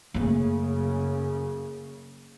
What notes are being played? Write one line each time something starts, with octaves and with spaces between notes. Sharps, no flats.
F#2 C#3 A3 A#3